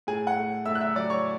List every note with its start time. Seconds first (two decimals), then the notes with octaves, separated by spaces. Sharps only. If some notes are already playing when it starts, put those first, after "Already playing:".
0.07 A2 G#4 G#5
0.27 F#5
0.37 A3
0.66 A2 E5 E6
0.75 F#6
0.81 E5 E6
0.95 F#3 D5 D6
1.10 C#5 C#6